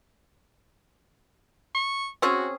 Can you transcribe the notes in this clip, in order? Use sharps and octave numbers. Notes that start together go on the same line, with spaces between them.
C#6
C4 C#4 F#4 G#4